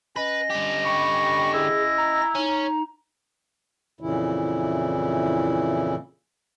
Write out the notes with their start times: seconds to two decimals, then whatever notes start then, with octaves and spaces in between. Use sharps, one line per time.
0.16 C#4 B4 D#5 A#6
0.50 D3 G4
0.85 B5 C#6
1.54 E4 G#4
1.98 A#5
2.35 C#4 D#4
4.01 F2 A#2 C#3 E3 E4